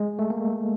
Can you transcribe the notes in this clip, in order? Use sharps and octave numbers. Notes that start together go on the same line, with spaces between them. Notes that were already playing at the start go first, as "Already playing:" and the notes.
Already playing: G#3
A3
A#3